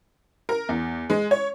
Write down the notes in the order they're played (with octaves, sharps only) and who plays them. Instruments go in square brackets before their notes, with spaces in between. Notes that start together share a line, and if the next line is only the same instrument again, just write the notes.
[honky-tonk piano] A#4
E2
G#3
C#5